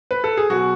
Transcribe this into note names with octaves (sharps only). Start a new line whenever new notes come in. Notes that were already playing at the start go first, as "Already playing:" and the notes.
B4
A4
G#4
B2 F#3 F#4